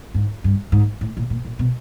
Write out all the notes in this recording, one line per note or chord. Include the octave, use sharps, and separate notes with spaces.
G#2
G2
G#2
A2
A#2
A#2
A#2
B2